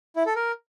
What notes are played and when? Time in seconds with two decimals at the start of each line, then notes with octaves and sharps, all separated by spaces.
0.16 E4
0.26 A4
0.36 A#4